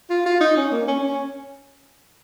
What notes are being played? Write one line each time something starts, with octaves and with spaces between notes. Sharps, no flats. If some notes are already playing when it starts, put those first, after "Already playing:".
F4
F4
D#4
C#4
A#3
C#4
C#4